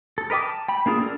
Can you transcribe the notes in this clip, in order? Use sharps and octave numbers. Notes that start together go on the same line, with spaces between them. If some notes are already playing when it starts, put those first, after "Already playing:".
A4
A#4 B4 D#5 G5 D6
A5
G5 B5
A#3 D4 F4 G#4
D4 A4 A#4